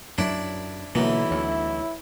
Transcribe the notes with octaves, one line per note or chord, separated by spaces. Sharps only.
F#2 F#3 D4 E4
B1 B2 D3 E3 A#3 E4 F4 A#5
D2 C#5